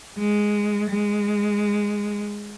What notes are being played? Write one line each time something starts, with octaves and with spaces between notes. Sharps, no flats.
G#3
G#3